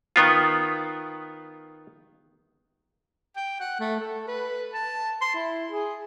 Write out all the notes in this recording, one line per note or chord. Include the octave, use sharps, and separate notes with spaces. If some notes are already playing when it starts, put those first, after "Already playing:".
D#3 B3 F4
G5
F#5
A3
A4
B4
A5
C6
E4
G#4